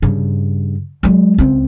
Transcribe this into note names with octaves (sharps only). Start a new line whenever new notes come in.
G2 C#3
F#3 G#3
C#2 C4